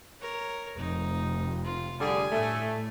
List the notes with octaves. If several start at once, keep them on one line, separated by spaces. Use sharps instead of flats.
A#4 C#5
F1 D#4
F4
D3 G3 G#4 G#5
A2 A3